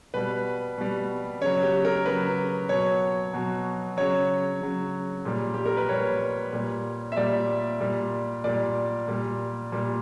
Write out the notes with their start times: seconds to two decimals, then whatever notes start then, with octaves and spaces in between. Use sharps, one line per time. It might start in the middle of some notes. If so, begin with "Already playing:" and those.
0.14 B2 G3 B4
0.78 B2 G3
1.41 C#3 F#3 C#5
1.63 G4
1.85 A#4
2.05 C#3 F#3 B4
2.69 B2 F#3 C#5
3.33 B2 F#3
3.97 C#3 F#3 C#5
4.61 C#3 F#3
5.25 A#2 G3
5.54 G4
5.66 A#4
5.77 B4
5.89 A#2 G3 C#5
6.53 A#2 G3
7.12 E5
7.17 A#2 G3 D5
7.80 A#2 G3
8.44 A#2 G3 D5
9.08 A#2 G3
9.72 A#2 G3